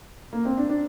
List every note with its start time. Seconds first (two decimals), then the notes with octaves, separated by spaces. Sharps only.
0.33 A#3
0.45 C4
0.58 D4
0.69 D4